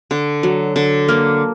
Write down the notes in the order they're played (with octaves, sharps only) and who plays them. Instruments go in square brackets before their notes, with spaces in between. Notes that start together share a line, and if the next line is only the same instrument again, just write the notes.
[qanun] D3
F#3
D3
A#3